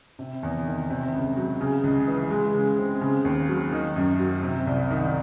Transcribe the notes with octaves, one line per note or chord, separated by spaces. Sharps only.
C3
E2
D#3
C3
C#2
F#3
C#3
C#2
E3
G#3
C#3
C4
C#3
D#2
F#3
D#3
F#2
F#3
C3
C2
D#3